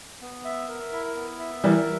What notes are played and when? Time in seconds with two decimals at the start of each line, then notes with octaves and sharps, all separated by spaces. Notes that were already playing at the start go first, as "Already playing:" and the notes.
0.21 B3
0.45 E5
0.69 A#4
0.93 E4
1.16 B3
1.39 E5
1.63 E3 G3 A#4